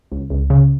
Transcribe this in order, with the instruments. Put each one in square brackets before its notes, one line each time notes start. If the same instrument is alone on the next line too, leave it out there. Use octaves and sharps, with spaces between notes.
[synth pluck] C#2
C#2
C#3